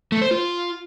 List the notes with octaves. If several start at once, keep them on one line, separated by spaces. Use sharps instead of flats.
A3
C5
F4